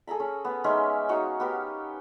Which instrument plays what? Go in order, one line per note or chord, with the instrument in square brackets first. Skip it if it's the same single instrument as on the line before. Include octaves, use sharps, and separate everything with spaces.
[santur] G#4 A4 A#5 B5
C#4
B3
G#3 C#4 D#4 E5
D#4 F#4 C#5 F5
B3 G4 A#4